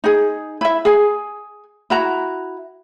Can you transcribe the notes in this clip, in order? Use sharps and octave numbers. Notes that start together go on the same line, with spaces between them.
D#4 G#4
E4 E5
G#4 G#5
E4 F#4 A#5